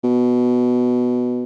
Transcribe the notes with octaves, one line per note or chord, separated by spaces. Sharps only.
B2